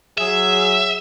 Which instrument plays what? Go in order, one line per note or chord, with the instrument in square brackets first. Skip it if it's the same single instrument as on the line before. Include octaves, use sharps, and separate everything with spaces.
[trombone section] F#3 G#4 [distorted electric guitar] E5